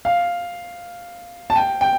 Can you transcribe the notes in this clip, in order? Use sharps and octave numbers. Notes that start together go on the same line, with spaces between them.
F5
A5
G5
G5